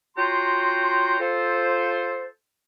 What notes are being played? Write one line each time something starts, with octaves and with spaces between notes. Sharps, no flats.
C#4 F4 F#4 G5 A#5 C6
F4 A4 C5